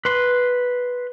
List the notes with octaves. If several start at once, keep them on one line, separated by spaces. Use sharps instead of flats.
B4 C6